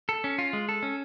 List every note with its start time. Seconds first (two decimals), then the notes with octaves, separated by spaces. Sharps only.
0.09 A4
0.24 C#4
0.38 F4
0.53 G#3
0.69 A4
0.83 C#4